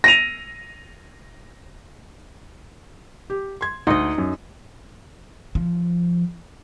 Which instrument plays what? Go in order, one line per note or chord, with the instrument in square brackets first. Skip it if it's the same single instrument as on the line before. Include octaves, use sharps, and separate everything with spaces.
[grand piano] A#6 D#7 F7
[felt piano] G4
C6 G#6
[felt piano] D2 [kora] D#4 D#5
[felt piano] F#2
[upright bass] F3